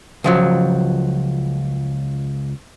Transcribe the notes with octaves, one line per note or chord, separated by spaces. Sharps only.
C#2 F3 F#3